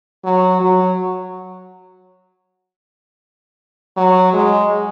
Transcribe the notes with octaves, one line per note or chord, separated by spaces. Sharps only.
F#3
F#3
F#3
G#3